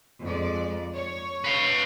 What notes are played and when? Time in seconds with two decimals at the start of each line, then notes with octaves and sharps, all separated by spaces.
0.22 F2 G#3 D5
0.94 C#5
1.44 B4 F5